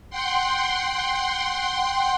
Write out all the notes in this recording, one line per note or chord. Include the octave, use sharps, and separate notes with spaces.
F#5 G5 C6